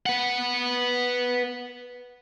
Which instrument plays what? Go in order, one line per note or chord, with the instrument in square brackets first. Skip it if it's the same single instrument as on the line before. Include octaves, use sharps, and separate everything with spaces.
[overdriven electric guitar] B4 F#5